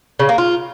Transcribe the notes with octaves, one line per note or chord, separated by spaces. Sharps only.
C#3
A#3
F4